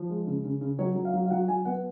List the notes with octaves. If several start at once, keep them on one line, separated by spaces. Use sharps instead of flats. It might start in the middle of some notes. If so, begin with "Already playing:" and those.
Already playing: F3
G#3
C#3
C#3
C#3
F#3 C#5
F#3
F5
F#3
F5
F#3 F#5
F#3 G#5
B3 F#5